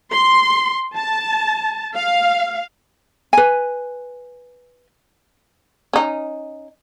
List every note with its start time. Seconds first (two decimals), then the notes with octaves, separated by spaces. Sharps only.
0.13 C6
0.97 A5
1.96 F5
3.33 B4 G#5
5.93 C#4 D#4